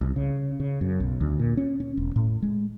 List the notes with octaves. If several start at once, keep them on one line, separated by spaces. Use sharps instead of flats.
C2
C#3
C#3
F#2
B1
D2
A#2
C#4
C#4
E1
A2
G#3